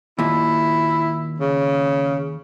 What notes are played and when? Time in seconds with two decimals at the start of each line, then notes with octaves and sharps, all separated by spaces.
0.19 D#2 A#2 E4
1.40 C#3